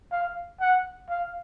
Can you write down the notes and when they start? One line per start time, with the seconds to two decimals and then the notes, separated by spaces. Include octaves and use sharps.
0.11 F5
0.60 F#5
1.09 F5